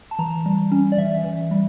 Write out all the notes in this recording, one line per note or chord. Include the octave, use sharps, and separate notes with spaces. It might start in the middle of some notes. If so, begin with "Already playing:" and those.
A5
E3 A#5
G3
C#4
D5
E3 E5
E3
G3